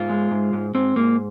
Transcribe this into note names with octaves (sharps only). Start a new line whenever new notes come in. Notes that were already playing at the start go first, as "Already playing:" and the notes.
Already playing: G#2 F4
G#3
G#2
G#2
G#2 C4
G#2 A#3